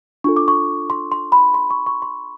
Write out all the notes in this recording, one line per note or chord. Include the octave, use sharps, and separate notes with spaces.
D4 F4 A4 C#6
D6
C#6
C6
C6
B5
C6
C#6
C#6
C6